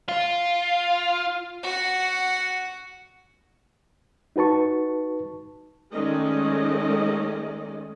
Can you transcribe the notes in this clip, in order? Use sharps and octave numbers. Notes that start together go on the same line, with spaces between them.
F4
F#4 F#5
D#4 F#4 B4 A5 C#6
D#3 G#3 A3 C#4 D5 D#5